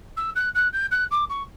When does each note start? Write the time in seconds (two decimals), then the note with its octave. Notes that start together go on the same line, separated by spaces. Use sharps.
0.17 E6
0.35 F#6
0.54 F#6
0.73 G6
0.91 F#6
1.11 D6
1.29 C#6